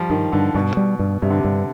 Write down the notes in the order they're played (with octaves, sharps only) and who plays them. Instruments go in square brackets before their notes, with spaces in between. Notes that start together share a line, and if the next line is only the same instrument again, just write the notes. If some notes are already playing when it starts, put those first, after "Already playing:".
Already playing: [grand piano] F3 G3
[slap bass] G2 [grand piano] D#3
[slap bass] G2 [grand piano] D3
[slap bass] G2 [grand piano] B2
[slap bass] G3
G2
[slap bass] G2 [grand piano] C3
[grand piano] D3
C3
[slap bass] G2